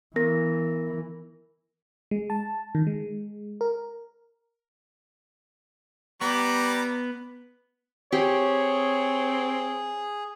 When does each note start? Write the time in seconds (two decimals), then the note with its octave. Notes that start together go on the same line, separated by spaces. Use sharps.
0.16 E3 B3 A#4 A#6
2.11 G#3
2.30 A5
2.75 D#3
2.87 G#3
3.61 A#4
6.21 G3 B3 A#5 D6
8.12 C4 G4 G#4 C#5